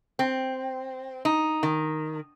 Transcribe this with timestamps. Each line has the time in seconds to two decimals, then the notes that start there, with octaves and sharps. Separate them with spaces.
0.19 C4
1.25 D#4
1.63 D#3